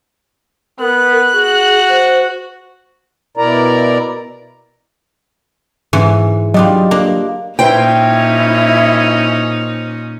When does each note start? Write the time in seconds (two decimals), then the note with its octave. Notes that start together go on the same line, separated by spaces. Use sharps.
0.80 B3 A#4 F#6
1.34 F#4 G#4
1.89 C5
3.37 B2 E4 A#4 D5 A#5
5.93 G#2 E3 C#4
6.54 F#3 G3 D4 F4 D#5
6.91 A#3 D4
7.59 A#2 C#4 D#4 E4 C5 G5